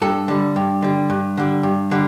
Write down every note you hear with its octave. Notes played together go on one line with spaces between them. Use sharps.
G2 A4
D3 G3
G2
D3 G3
G2
D3 G3
G2
D3 G3